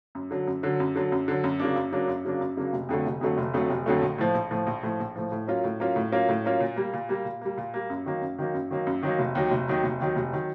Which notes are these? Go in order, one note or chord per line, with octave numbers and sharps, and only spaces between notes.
F#2
D3 F#3
F#2
D3 F#3
F#2
D3 F#3
F#2
D3 F#3
F#2
C#3 F#3 A#3 D4
F#2
C#3 F#3 A#3 D4
F#2
C#3 F#3 A#3 D4
F#2
C#3 F#3 A#3 D4
F1
F2 D3 F#3 A3
F1
F2 D3 F#3 A3
F1
F2 D3 F#3 A3
F1
F2 D3 F#3 A3
A#1
A2 F3
A#1
A2 F3
A#1
A2 F3
A#1
A2 F3
A2
F#3 A#3 C#4 F4
A2
F#3 A#3 C#4 F4
A2
F#3 A#3 C#4 F4
A2
F#3 A#3 C#4 F4
A#2
G3 A#3
A#2
G3 A#3
A#2
G3 A#3
A#2
G3 A#3
F#2
D#3 F#3 A#3
F#2
D#3 F#3 A#3
F#2
D#3 F#3 A#3
F#2
D#3 F#3 A#3
F1
D#2 D#3 F#3
F1
D#2 D#3 F#3
F1
D#2 D#3 F#3
F1
D#3 F#3